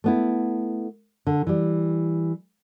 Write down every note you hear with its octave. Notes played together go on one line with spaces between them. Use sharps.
A3 B3 E4
D3
E3 G3